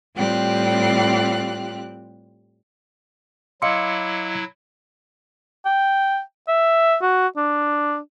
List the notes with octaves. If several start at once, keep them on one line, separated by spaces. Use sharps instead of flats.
A2 G3 C4 F4 G4 F#6
F#3 E4 D#5 F5 C6 D6 E6 C#7
G5
E5
F#4
D4